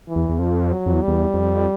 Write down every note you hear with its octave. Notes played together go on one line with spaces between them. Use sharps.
E3
E2
E2
F2 F3
F#3
F2
E2
G3
E2
F2